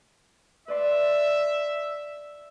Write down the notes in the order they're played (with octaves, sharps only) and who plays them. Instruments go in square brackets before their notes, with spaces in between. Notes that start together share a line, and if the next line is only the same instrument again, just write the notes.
[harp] B4 D5 C6 [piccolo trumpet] E5